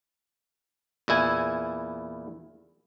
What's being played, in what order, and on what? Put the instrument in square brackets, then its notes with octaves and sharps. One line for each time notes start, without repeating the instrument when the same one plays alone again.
[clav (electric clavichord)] E2 A#2 E4 G#5